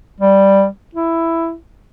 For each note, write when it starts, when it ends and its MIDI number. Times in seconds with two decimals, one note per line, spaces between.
0.20 0.66 55
0.95 1.53 64